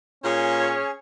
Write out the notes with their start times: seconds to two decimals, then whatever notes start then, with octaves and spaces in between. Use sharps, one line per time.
0.24 A#2 C#4 G#4 C#5